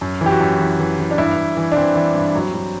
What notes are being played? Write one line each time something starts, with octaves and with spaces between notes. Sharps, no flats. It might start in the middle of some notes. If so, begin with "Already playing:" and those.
F#2
E3 G4
F#4
F#2
E3
E3
E3
D4
G2 E4
G2
E3
D4
E3 C4
E3
G2
F#3
F#3